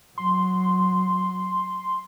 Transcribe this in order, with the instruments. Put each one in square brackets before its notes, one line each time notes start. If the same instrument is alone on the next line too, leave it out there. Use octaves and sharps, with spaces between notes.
[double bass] F#3 [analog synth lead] C6